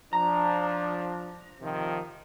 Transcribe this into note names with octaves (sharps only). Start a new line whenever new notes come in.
F3 D4 A#5
C3 D#3 F3